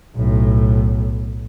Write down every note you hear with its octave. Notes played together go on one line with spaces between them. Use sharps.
B1 A2